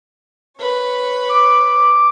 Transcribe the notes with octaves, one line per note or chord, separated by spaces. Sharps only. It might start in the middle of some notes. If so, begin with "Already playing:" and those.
B4 C#5
D6